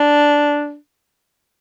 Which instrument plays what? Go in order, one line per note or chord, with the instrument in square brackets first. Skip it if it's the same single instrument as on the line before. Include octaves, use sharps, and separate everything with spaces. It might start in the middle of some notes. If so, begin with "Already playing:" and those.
Already playing: [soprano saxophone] D4